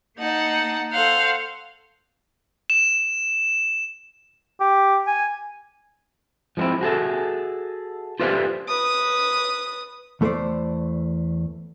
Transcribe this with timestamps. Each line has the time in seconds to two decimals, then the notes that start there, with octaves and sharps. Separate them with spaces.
0.18 A#3 D#4 F#5 A5
0.92 A4 C5 F5 F#5
2.70 E7
4.60 G4
5.07 G#5
6.57 F3 G#3 B3 C4 E4
6.81 F#4 G#4 A4 E5
8.20 F4 G4 B4 C5 D5 E5
8.68 B4 D#6
10.21 E2 A3 A4 B4 C5 D5